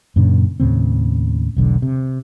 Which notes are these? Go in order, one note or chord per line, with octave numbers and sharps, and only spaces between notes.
F#2 A#2 C#3 D4
D#2 A2 C#3 C4
E1 B1 D3
C3